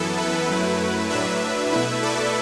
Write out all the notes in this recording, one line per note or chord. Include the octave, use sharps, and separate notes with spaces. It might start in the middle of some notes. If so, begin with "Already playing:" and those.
Already playing: F#2 E3 B3 E4 A4
B4
F#2 F#3 A3 E4
A2 F#3 D4 B4 E5
B2 A3 E4
A4 D5